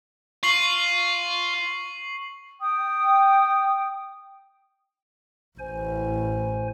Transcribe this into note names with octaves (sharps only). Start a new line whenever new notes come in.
F4 C#6 C7 F#7
G5 D#6
A1 A2 C5 G#5